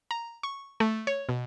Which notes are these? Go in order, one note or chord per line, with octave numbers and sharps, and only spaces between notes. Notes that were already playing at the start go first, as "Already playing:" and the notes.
A#5
C#6
A3
C#5
B2